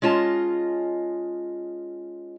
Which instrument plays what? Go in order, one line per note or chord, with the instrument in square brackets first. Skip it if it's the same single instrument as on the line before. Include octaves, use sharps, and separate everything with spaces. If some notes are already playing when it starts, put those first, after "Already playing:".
[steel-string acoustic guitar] G#3 C#4 F4 D#5 A5